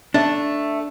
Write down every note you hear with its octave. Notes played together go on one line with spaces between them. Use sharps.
A3 D4